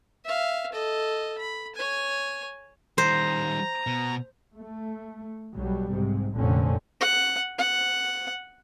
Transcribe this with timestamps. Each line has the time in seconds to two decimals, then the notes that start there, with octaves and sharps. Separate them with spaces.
0.25 E5 F5
0.72 A4 D#5
1.38 B5
1.75 C#5 G#5
2.98 D#3 G3 C5 A#5
3.87 B2
4.54 A3
5.53 B1 B2 F#3 G3
5.91 G#2 C3
6.36 F1 A#2 D3 C4 C#4
7.01 F#5
7.58 F#5